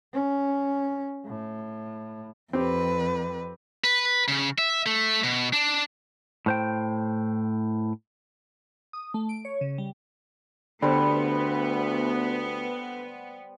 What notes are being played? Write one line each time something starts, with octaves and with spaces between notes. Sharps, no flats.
C#4
A2
F2 C4 G4 B4
B4
C#3
E5
A3
B2
D4
A2 C5 G5
D#6
A3
D7
C#5
C#3
G3
D2 D3 G3 B3 C5